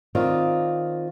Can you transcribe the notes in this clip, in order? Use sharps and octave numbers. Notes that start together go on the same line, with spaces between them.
D#3 C4 F4 D5 D#5